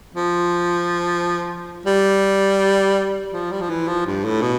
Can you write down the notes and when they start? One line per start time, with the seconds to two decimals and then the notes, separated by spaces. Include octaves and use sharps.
0.15 F3
1.86 G3
3.32 F3
3.51 G3
3.61 F3
3.70 E3
3.88 F3
4.06 G2
4.24 A2
4.42 B2